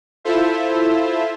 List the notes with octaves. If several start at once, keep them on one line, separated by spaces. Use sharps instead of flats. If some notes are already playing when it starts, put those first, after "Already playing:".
E4 F4 A4 C5 E5